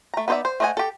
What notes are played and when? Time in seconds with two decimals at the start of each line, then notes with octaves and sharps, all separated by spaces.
0.14 A3 A#5
0.28 B3 D#4 C5 D5 E5
0.45 C5
0.60 A3 C5 D#5 F#5 G#5
0.77 G4 A4